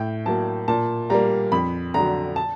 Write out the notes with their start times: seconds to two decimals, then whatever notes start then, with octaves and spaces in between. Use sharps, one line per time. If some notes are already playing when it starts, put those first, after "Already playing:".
Already playing: A2 G5
0.26 F#3 A#3 A5
0.68 A#2 A5
1.10 G3 A#3 A#5
1.52 F2 B5
1.94 D3 F#3 A#5
2.36 A5